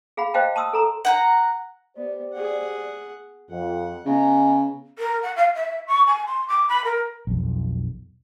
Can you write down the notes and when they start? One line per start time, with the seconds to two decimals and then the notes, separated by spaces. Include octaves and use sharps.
0.17 G#4 F5 F#5 B5
0.34 C5 D#5 F5 G5 A5
0.56 A5 C6 D#6 E6
0.73 A4 A#5 C6
1.05 F#5 G5 A#5
1.97 B3 G4 C5 D5
2.33 G#4 F#5
3.50 F2 F#5
4.06 C#3 B3 D#5 G#5 A#5
4.98 A#4
5.22 F#5
5.36 F5
5.54 E5
5.87 C#6
6.07 G#5
6.26 C6
6.48 D6
6.68 B5
6.85 A#4
7.27 B1 F2